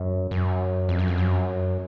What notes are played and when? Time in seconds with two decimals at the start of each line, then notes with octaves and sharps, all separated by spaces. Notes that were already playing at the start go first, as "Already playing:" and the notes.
Already playing: F#2
0.31 F#2
0.89 F2
0.99 F#2
1.08 F2
1.18 F#2